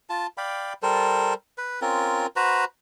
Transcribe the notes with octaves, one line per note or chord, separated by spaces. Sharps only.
F4 A5
D5 F5 G5 B5
G3 A4 A#4 C5
B4
C4 C#4 F4 A#4
F#4 B4 C5 A#5